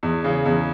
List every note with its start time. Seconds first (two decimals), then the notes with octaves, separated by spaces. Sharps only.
0.03 E2
0.24 C#3
0.45 E2